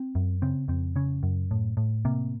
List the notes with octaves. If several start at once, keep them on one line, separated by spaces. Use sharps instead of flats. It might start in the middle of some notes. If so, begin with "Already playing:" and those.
Already playing: C4
F#2
C#3 C4
F2 C4
C#3 C#4
F#2
A2
A2
C3 A#3